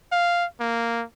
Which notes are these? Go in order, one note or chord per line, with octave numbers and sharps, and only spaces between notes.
F5
A#3